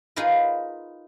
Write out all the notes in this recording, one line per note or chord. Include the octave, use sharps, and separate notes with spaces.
D#4 F4 G#4 A#4 B4